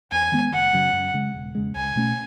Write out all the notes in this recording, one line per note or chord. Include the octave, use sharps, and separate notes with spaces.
E2 G#5
D#3 G#3 B3
F#1 F#5
F#2 C#3 F#3
F#2
C#3 G#3
E1
E2 C#3 G#3
C#2 G#5
B2 A3 C#4